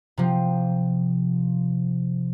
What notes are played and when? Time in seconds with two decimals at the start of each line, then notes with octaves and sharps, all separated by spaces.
0.17 C3 F3